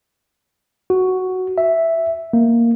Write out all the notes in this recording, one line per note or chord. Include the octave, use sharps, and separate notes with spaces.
F#4
E5
A#3